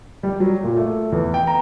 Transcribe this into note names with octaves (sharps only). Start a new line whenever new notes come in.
G3
F#3
A#2
A3
E2
G5
A#5